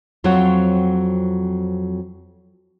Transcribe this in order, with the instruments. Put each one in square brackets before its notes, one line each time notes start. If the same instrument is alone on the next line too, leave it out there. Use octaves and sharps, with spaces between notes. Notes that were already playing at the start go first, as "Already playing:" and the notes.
[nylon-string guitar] F2 F#3 C4 F4 C#5 F#5